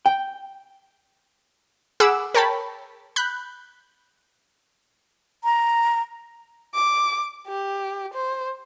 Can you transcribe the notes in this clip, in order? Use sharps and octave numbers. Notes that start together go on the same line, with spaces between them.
G5
G#4 F#5 B5 D6 E6
A#4 C#5 G5 A5 B5
B5 F#6 G6
A#5
D6
G4
C5